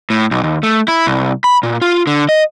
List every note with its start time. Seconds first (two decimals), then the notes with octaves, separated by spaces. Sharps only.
0.10 A2
0.31 B1
0.44 D#2
0.63 A3
0.88 E4
1.07 C2
1.44 B5
1.63 A#2
1.82 F4
2.07 D3
2.29 D#5